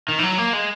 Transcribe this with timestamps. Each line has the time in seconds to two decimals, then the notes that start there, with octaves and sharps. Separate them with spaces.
0.08 D#3
0.19 E3
0.23 F#3
0.38 A#3
0.53 G#3